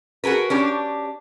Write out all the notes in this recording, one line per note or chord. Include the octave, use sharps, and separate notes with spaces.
F#4 G#4 A#4 B4
C#4 D4 G4